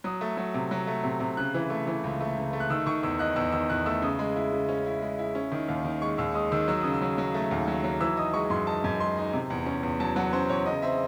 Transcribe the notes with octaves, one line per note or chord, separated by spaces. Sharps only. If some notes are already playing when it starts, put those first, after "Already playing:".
F#3 D#6
A3
F#3
C3
F#3
A3
C3
C3
C#3 F#6
E3
A3
E3
C#2
A3
C#2
A3
F#6
D#3 E6
D#3 C#6
E2 E6
D#4 F#6
E2 E6
D#3 E6
E2 F#6
A3 E6
C#3 D#6
G#3
E4
C#3
C#4
E4
G#3
E4
C#4
D#3
D#2
D#3
G#3 C#6
D#2 E6
G#3 D#6
D#3 E6
F#3 E6
C#3 D#6
E6
F#3
F#3
A3
D#2
F#3
F#3
E3 E6
D#4 D#6
G#3 C#6
F#2 C6
D#4 A5
F#2
G#3 C6
D#4
C3
E2
C#4
E2
F#3 A5
F#3 F#5
C#4 C5
E2 C#5
C#3 D#5
C4 E5